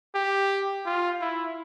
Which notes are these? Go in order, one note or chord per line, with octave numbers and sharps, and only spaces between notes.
G4
F4
E4